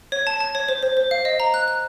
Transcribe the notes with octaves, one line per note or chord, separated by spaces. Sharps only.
C#5
A5
A5
C#5
C5
C5
C5
F5
D#5
A#5
F#6
F#6